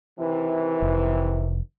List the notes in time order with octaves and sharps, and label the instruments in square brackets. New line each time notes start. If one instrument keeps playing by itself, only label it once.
[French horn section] C3 D#3 E3
[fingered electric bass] F1